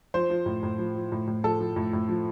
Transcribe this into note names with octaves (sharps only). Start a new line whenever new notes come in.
F3 C5
F3
A2
A2
F3
F3
A2
A2
F3 A4
F3
A2
A2
F3